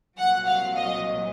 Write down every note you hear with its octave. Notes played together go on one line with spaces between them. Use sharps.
C2 A#2 F#3 F#5
F5
D#5